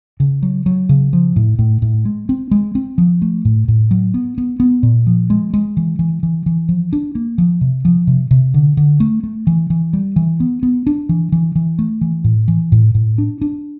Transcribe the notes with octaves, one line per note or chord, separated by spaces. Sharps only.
C#3
F#3
F#3
C#3
F3
A2
A2
A2
G#3
C4
G#3
C4
F3
A3
A2
A2
F#3
B3
B3
B3
A#2
F3
G#3
G#3
E3
E3
E3
E3
F3
D4
A#3
F3
C3
F3
C3
C3
D3
D3
A3
A3
E3
E3
G3
E3
B3
B3
D4
E3
E3
E3
A3
E3
A2
E3
A2
A2
D4
D4